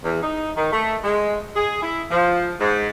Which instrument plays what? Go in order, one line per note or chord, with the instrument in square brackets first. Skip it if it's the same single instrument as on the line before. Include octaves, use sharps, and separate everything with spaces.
[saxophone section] E2
D#4
D#3
A3
G#3
G#4
E4
F3
G#2